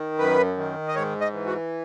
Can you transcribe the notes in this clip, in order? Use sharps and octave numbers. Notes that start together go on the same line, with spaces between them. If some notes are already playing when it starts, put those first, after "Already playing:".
Already playing: D#3
F#2 B4
D#3
D#5
G#2 C#5
D#5
E3
F#4